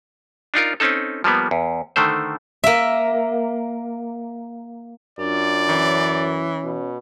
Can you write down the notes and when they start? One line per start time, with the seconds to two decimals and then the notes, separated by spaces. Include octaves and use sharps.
0.54 D4 D#4 F4 A#4
0.80 C4 C#4 D#4 A4
1.24 F3 G3 A#3 B3
1.51 E2
1.96 D3 D#3 A3 C5
2.64 A#3 E5
5.19 F#2 D4 F4 D5
5.69 E3 C#4 C#5
6.63 B2